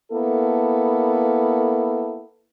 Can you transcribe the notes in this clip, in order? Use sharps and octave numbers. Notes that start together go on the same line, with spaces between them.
A#3 B3 E4 A4